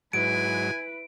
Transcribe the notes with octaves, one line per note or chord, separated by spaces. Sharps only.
G#2 F#3 E4 B4 G#5 D7